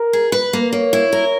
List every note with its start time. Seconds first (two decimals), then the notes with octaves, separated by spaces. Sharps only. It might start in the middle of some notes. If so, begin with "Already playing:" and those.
Already playing: A#4
0.13 G#4
0.32 B4
0.53 A#3
0.73 A#3 C#5
0.93 E4
1.12 A#4